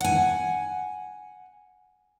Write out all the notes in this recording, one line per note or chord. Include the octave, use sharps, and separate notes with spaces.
F#5 G#5